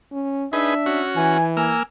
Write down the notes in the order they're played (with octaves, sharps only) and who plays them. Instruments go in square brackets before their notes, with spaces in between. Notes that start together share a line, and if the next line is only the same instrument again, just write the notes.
[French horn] C#4
[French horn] D4 [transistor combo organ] D#4 G#4 B4 [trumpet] E5
[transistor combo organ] C#4 F#4
[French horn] E3 [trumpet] G#5
[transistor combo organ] A#3 E6 F6 [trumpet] G#5